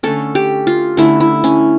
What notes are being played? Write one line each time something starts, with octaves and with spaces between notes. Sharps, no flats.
D3 A3 C#4 A4
G4
F4
D3 A3 C#4 E4
E4
C#4